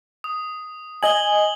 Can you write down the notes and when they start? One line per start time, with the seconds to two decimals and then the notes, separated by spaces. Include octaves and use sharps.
0.24 D#6
1.03 D#5 G#5 F#7 G7